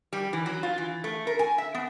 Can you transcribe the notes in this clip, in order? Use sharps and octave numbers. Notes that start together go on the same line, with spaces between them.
G3
E3
F#3
F4
E3
A3
A#4
G#5
E5
B3